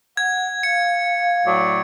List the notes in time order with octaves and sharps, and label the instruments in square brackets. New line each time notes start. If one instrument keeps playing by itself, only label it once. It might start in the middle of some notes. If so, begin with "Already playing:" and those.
[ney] F#5 [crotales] G#6
[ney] F5 [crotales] C#7
[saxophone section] A2 F#3 D5